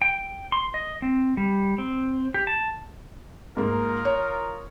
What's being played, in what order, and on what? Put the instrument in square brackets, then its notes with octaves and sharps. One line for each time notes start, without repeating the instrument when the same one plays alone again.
[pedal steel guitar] G5
C6
D#5
C4
G3
C4
G4
A5
[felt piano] G#2 A#3 [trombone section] D#4 F4 A#4
[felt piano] C#5